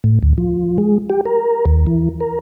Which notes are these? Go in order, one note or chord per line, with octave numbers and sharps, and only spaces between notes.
A2
D2
F3
G#3
G4
A#4
D#2
E3
A#4